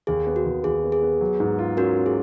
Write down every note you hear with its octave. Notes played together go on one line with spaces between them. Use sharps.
D#2 G#4
B3
F#4
D#2
D#2 G#4
B3
G#4
B3
F#3
G#2
F4
C#4 F#4 A#4
C#4
G#4